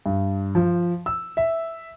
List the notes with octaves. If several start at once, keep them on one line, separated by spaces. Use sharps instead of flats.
G2
F3
E6
E5